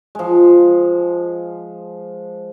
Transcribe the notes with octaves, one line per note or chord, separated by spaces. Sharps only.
F3 G#3